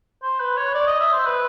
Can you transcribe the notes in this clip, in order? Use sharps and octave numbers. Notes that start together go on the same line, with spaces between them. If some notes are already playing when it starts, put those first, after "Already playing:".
C5
B4
C#5
D5
D#5
E5
C5
B4